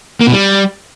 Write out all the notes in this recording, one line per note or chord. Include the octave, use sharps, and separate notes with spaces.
A#3
B2
G3